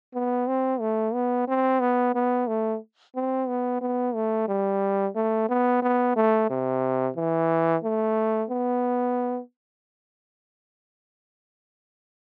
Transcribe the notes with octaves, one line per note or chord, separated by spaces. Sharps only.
B3
C4
A3
B3
C4
B3
B3
A3
C4
B3
B3
A3
G3
A3
B3
B3
A3
C3
E3
A3
B3